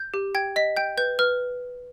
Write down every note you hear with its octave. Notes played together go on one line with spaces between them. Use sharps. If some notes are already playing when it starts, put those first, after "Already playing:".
Already playing: G6
G4
G5 G#6
D#5 B6
G5 G6
B4 G6
B4 F6